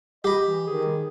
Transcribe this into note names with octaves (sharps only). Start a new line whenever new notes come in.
G4 D#5 B5
E3
D#3 G#4